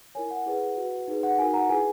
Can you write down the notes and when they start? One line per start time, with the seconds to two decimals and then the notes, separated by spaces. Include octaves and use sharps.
0.15 E4 A#4 C#5 G#5
0.31 F#5
0.46 E4 G#4 B4
0.77 F#4 B4
1.08 D#4 G#4 B4
1.23 F#5
1.38 D#4 F#4 A#4 G#5
1.54 F#5 A#5
1.69 E4 G#4 B4 G#5